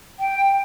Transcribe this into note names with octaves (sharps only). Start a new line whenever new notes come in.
G5